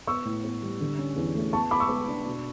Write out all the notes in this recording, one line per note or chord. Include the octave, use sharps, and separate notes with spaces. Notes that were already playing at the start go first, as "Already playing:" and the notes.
B3 C#6 E6
A2
B3
G3
D3
C#4
E2
A3
B3 A5 C#6
B3 B5 D6
C#6 E6
B3
D4
B2